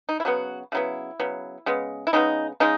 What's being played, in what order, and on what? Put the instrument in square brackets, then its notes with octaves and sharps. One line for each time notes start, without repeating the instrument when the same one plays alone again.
[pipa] D#4
E4
C#3 F#3 B3 F#4
C#3 F#3 B3 E4
C#3 F#3 B3
C#3 G#3 B3
E4
C#3 G#3 B3 D#4
C#3 G#3 D#4